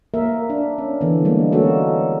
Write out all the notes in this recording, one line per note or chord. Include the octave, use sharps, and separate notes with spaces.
A#3 A#4 E5
D4
C#4
D3 E3 B3
G3 G#3 A#3
G3 G#3 A#3 C#4 F#4 A4